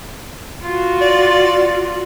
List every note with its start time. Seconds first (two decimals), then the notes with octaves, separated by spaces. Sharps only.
0.62 F4 F#4
1.01 D5